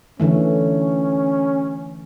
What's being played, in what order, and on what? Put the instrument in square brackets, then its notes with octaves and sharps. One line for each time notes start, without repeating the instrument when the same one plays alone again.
[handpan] D3 E3 A3 [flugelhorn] C#4